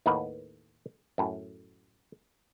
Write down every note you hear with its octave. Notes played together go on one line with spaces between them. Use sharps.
D#2 A2 D#4 A#4 B4 F#5
F#2 A2